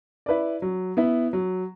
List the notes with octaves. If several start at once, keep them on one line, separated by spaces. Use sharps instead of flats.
E4 B4 D5
F#3
B3 E4
F#3